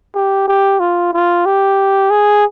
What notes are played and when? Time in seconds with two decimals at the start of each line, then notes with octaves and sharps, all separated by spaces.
0.15 G4
0.48 G4
0.80 F4
1.13 F4
1.46 G4
2.11 G#4